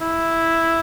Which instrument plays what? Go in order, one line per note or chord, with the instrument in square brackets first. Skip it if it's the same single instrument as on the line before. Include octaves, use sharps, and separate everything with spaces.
[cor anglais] E4